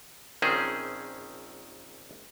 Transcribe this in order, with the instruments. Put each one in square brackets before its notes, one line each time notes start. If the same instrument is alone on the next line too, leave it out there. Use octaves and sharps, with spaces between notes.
[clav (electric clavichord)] A#1 D#3 C4 C#4 G#4 C5